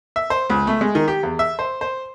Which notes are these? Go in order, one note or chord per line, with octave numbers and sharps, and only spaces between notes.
E5
C5
C#2
A3
G#3
D#3
G4
E2
E5
C5
C5